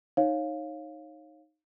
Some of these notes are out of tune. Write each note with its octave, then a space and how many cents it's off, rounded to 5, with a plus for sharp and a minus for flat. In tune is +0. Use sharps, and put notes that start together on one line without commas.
D#4 +0 C#5 -25 F5 +5